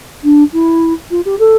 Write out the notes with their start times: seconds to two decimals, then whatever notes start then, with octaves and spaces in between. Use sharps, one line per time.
0.24 D4
0.53 E4
1.11 F4
1.25 G4
1.39 A4